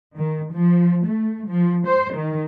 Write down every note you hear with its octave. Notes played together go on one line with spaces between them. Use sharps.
D#3
F3
A3
F3
C5
D#3